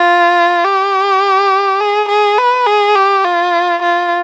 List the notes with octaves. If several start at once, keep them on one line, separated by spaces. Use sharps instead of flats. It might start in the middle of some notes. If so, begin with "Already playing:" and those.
Already playing: F4
G4
G#4
G#4
B4
G#4
G4
F4
F4